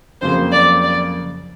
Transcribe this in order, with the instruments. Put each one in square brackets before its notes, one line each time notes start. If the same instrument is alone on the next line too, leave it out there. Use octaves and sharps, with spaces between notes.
[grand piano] F2 C#3 F#3 A#3 [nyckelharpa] C5
[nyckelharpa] D5
D5